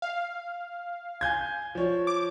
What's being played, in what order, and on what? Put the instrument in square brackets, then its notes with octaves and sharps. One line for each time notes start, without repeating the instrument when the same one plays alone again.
[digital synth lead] F5
[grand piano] G#5 G6 G#6
F3 C#5
[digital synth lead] D6